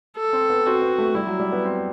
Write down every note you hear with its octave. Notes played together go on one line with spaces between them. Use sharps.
A4
C4
B3
C4 F#4
B3
A3
G3 E4
F#3
G3
B3
C4